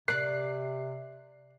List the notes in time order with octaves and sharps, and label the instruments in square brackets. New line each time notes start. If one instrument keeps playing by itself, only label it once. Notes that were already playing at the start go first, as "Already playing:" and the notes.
[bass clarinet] C3 [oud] A#4 D5 [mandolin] F#6 [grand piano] C7